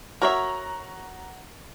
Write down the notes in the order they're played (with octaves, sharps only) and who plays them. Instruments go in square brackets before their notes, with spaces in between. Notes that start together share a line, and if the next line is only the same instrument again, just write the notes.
[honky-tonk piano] F#4 A#5 [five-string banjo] A#4 C#5 E5